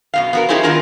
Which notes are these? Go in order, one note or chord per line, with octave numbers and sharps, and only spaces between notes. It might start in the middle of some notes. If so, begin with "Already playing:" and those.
F#2 B2 F5
B3 F#4 A#4
C#4 D#4 E4 G4 G#4 C5
D#3 B3 F4 G#4 A#4